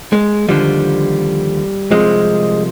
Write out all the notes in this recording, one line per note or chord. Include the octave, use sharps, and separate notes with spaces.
G#3
D#2 D3 F3 G3
C2 C3 F3 G#3